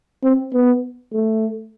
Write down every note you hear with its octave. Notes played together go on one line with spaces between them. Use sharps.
C4
B3
A3